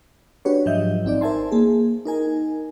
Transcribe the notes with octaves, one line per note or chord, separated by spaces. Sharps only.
D4 F#4 G4 B4 C#5
G#2 F3 F#3 D#5 E5 G6
G#1 C4 D#4 D5
A#4 C5 E5 G#5 A5 C6
A#3 G#4
D#4 A#4 G#5